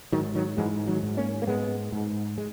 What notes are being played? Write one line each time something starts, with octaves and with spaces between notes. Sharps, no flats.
G#2 D#3 F#3
D#3 F#3
G#2 E3 G#3
D#3 F#3
G#2
A#3 C#4
A#3
G#2 G#3 B3
G#2
G#3